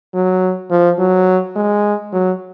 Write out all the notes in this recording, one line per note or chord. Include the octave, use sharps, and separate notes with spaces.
F#3
F3
F#3
G#3
F#3